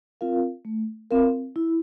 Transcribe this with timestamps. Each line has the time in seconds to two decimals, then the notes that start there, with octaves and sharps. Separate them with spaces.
0.21 C4 F4 A#4 F5
0.65 A3
1.11 C4 F4 A#4 F5
1.56 E4